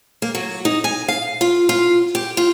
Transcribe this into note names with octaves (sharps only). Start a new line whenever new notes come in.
A#3
F#3
D#4
G#5
F5
F4
F4
G4
F4